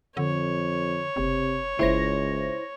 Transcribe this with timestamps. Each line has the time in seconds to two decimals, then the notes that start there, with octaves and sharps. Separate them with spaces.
0.17 F2 D3 C#5
1.16 F#1 C3
1.79 F#1 C#2 E4 C5 A#6